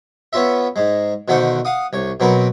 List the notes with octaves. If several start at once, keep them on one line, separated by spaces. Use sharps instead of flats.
B3 C#4 F4 E5
G#2 G#3
B2 D3 D#3 A3 C5 F#5
F5 F#5 D#6
C2 C#5
B2 F#3 C4 A#4 B4